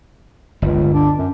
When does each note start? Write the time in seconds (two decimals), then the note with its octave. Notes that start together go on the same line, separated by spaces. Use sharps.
0.62 G1 C#2
0.94 D4
1.18 F#2